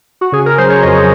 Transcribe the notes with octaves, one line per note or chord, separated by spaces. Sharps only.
F#4
C#3 G#4
A#4
F#3 C5
C#5
F2 D#5